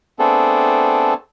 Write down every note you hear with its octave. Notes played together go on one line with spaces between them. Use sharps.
A3 B3 C4 D4 G#4 A4